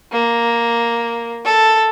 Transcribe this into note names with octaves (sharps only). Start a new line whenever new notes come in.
A#3
A4